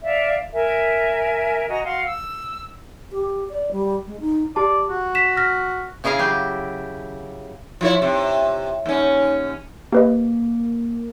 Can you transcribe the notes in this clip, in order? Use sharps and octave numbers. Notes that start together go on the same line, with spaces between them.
D5 E5 F5
A#4 E5 G#5
F#4 D#5 G#5 A#5
F#4 F5 F#5 C6
E6
G4
D5
G3
G#3
D#4
G4 D5 A5
F#4
B6 E7
F6 A#6 B6
C#3 E4 G#4 F5 A#5
F#3 G4
F3 E4 C#5
C3
D#2 C#4
A#3 G4 B4 D#5